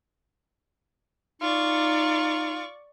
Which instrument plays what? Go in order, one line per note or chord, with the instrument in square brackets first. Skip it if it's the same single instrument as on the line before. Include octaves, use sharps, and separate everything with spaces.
[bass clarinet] D#4 [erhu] F4 [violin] D5 C#6